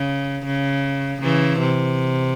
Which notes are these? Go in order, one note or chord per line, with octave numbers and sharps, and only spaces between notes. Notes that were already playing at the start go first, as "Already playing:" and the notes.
Already playing: C#3
C#3
C#3 E3
C3